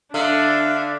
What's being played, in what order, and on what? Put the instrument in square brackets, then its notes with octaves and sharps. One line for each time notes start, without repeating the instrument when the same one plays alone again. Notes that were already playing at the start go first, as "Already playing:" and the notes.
[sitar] D3 [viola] D4 [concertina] E5 F5